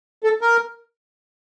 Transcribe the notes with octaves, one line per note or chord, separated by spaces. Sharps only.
A4
A#4